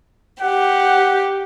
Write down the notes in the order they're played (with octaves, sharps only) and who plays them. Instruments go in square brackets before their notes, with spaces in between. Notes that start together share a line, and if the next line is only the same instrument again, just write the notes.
[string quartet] G4 [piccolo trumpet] F#5